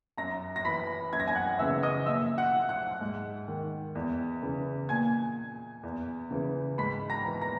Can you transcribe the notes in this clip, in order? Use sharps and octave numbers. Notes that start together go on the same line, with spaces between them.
F#2 A#5 A#6
A#6
E3 B5 B6
F#2 G#6
A#6
G#5 G#6
F#5 F#6
C#3 E3 E5 E6
D#5 D#6
A#2 E5 E6
F#5 F#6
F#5 F#6
G#2
D#3
E2
C#3 E3
A#2 G#5 G#6
E2
C#3 E3
G#2 B5 B6
A#5 A#6
E3
A#5 A#6